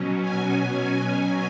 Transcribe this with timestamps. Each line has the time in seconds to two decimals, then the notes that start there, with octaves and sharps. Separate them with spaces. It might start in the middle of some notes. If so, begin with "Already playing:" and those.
Already playing: B2 F#3 C#4
0.20 G#5